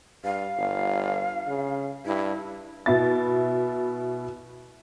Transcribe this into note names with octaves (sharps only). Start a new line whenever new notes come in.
G2 F5
G1
C#3
G2 E4
B2 E4 A6